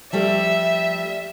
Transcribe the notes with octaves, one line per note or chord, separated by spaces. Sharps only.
F3 G3 A3 E5